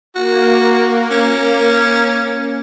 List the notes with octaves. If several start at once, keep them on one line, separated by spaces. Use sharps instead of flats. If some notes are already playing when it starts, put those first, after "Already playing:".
A#3 F#4
C#4